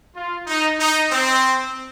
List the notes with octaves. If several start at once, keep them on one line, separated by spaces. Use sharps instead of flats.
F4
D#4
D#4
C4